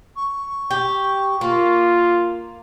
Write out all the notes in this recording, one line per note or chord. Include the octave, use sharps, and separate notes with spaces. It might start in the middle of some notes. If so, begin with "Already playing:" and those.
C#6
G4
A#3 F4